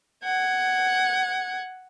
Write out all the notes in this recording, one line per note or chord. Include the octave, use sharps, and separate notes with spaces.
F#5 G#6